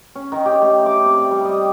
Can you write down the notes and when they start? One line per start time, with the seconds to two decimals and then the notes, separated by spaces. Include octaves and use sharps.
0.15 C#4
0.32 D#3
0.46 G4
0.62 A3
0.86 D6
1.06 C3
1.17 D5
1.31 G3
1.45 D#5